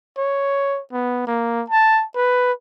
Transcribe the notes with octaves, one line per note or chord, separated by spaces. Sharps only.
C#5
B3
A#3
A5
B4